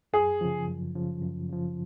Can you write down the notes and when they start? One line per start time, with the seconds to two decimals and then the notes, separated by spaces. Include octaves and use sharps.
0.13 F#2 G#4
0.41 C#3 F3
0.68 F#2
0.95 C#3 F3
1.22 F#2
1.49 C#3 F3